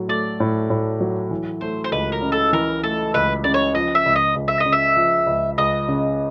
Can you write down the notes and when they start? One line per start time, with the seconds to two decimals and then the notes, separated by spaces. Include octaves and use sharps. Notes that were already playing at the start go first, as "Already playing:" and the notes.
Already playing: A2 F#3
0.09 A3 D5
0.40 A2
0.70 A2
1.01 F#3
1.31 E3
1.61 A3 C5
1.84 C5
1.92 C#2 B4
2.12 A#4
2.22 C#3
2.32 A4
2.53 E3 A#4
2.83 A3 A4
3.14 C#2 B4
3.44 C#3 D5
3.54 C#5
3.75 F3 D#5
3.95 E5
4.06 C#2
4.16 D#5
4.35 C#2
4.48 E5
4.60 D#5
4.66 C#3
4.72 E5
4.97 F3
5.27 C#2
5.58 C#2 D#5
5.89 C#3